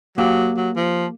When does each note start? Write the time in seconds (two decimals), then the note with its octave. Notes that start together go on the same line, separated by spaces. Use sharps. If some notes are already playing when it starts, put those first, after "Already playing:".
0.18 F#3 A#3 G4 F5
0.57 F#3
0.76 F3